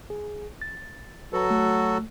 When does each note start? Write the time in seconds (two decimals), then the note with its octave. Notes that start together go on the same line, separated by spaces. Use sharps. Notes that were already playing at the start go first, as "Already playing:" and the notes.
0.10 G#4
0.61 A6
1.33 F#3 F#4 A4 B4 A#5
1.51 A3